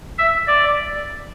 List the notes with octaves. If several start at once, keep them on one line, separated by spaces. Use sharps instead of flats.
E5
D5